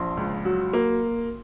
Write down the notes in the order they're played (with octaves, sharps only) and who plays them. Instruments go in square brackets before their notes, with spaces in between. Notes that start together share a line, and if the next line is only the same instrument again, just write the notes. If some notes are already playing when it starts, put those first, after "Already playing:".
Already playing: [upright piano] A#1 F3 C6
C#2
F#3
A#3